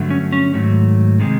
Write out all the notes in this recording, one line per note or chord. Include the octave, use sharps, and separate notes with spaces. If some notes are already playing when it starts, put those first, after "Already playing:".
Already playing: G2 D3 F#3 A3
C#4
C#4
G#2 D#3 F#3 A3
C3 D#3 G#3